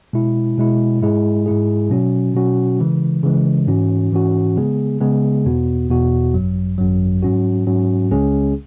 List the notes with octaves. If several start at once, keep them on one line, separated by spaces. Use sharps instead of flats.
B2 G#3 E4
B2 G#3 E4
G#2 G#3 E4 G#4
G#2 G#3 E4 G#4
B2 F#3 C#4 F#4
B2 F#3 C#4 F#4
C#3 E3 G#3
C#3 E3 G#3
G#2 E3 C#4 F#4
G#2 E3 C#4 F#4
C#3 G#3 B3 G#4
C#3 G#3 B3 G#4
E2 B2 B3 F#4
E2 B2 B3 F#4
G#1 F#2 F#3
G#1 F#2 F#3
G#2 F#3 C#4 F#4
G#2 F#3 C#4 F#4
C#2 C#3 G#3 C#4 G#4